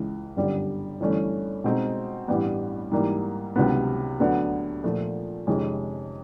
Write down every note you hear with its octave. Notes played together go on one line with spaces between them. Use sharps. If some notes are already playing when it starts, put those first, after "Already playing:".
Already playing: C#2 C#3 E3 G#3
G1 F#2 D3 G3
G1 G2 E3 A3 C#4
B2 G#3 C4 D#4
A1 G2 E3 G3 B3
G#2 E3 G3 A#3
C#2 C3 D#3 F#3 B3
D2 D3 F#3 B3
A#2 F3 A3
F2 C3 D#3 G#3 C#4